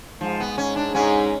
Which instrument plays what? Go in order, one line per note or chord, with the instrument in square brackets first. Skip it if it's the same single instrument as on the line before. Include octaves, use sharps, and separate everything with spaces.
[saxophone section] G#2 [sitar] F3
[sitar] B3
C#4
D4
[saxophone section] G#2 [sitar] C#4